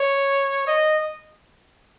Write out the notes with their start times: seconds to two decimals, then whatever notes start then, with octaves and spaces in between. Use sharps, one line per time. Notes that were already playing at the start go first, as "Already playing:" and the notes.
Already playing: C#5
0.67 D#5